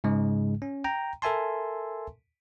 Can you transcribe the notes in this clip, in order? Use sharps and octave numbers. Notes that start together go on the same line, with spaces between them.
G#2 C#3 G#3
C#4
G5 A#5
A4 A#4 E5 G#5 A5 C6